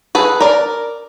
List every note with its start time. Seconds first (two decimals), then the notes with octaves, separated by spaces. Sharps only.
0.15 G#4 A4 B4
0.40 A#4 D5